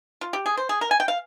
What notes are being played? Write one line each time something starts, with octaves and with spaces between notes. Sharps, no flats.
F4
G4
G#4
C5
G#4
A#4
G#5
G5
F5